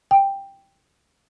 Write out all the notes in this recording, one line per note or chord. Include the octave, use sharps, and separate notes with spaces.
G5